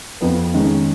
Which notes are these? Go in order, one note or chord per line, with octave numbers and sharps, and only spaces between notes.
F2 F3 B3
D#3 G#3 C#4